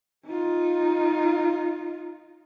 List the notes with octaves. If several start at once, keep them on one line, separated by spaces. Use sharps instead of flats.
D#4 F4